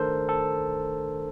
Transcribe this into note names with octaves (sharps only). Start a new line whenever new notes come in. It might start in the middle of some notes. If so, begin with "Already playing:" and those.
Already playing: D#3 A3 D4 A4 A#4 C5
A4